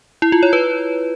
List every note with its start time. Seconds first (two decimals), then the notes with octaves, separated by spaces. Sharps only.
0.22 E4
0.32 F4
0.43 C#5
0.53 B4